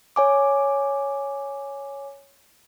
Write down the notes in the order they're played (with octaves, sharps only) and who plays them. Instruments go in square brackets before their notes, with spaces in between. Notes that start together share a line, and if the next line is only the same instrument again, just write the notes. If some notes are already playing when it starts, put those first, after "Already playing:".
[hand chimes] C#5 G#5 D6